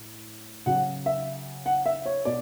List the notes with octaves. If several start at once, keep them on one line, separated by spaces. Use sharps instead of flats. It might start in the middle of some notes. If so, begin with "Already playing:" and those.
Already playing: A2
C#3 F#3 F#5
E5
F#5
E5
C#5
B2 D5